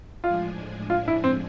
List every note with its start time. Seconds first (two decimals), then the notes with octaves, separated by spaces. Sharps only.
0.23 A2 F3 G#3 D4 F4 G#4
0.90 F4
1.08 E4
1.24 C4